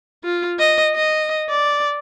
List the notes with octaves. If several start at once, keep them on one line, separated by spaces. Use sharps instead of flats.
F4
D#5
D#5
D5